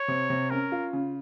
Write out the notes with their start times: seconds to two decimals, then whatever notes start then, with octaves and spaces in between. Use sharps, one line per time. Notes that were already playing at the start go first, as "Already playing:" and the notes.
Already playing: C#5
0.08 C3
0.30 C3
0.50 C#4 A#4
0.72 F4
0.93 C#3